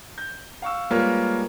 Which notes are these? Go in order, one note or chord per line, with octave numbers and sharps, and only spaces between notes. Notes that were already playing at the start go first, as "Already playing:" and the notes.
G6
F5 C#6 E6
G3 G#3 A#3 F4 B4 C#5